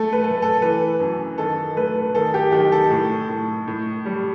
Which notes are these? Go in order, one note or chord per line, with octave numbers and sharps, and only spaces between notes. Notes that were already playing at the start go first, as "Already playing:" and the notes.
Already playing: A3 A4
B4
A3 A4
A4
E3 B4
F#2
D#3 A4
A3 B4
D#3 A4
G4
D#3 G4
A4
A2
A2
A2
G3